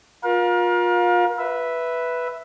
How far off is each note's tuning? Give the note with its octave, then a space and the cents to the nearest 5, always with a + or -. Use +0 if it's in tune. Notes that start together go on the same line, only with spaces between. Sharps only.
F4 +30 A#4 +35 F5 +30
B4 +0 E5 +0